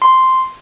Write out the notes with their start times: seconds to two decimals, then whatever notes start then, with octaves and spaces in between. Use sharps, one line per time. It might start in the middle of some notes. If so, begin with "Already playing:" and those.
0.02 C6